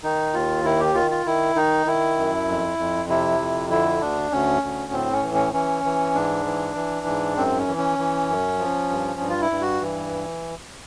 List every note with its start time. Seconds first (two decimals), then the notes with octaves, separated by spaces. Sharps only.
0.03 D#3 D#4
0.34 D#2 F4
0.65 D#3 E4
0.80 G4
0.95 D#3 F4
1.11 F4
1.26 D#3 E4
1.56 D#3 D#4
1.86 D#3 E4
2.17 F#2
2.48 F2
2.78 F2
3.09 C3 E4
3.40 F2
3.70 D3 E4
4.01 D2 D4
4.32 D2 C#4
4.62 D2
4.92 A2 C4
5.13 C#4
5.23 E3
5.34 C#4
5.53 E3 C#4
5.84 E3
6.15 G#2 D4
6.45 E3
6.75 E3
7.06 G#2
7.37 F#2 C4
7.58 C#4
7.68 E3
7.78 C#4
7.99 E3
8.29 F#2
8.59 F3
8.89 G2
9.20 G2
9.30 F4
9.41 E4
9.51 G2
9.61 F#4
9.81 E3